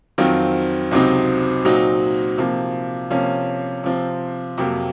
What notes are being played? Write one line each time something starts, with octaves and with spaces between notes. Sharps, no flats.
F2 D#3 F#3 C4 F4
C#2 C3 F#3 C4 D#4
A#2 F#3 C4 D#4 F#4
C3 F3 A#3
C3 F3 A#3 C#4
C3 F3 C4
F2 C3 F#3 A#3